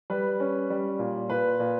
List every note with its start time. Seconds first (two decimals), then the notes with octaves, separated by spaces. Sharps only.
0.10 G3 B4
0.40 C#4
0.70 G3
0.99 A#2
1.30 A#2 B4
1.60 A#2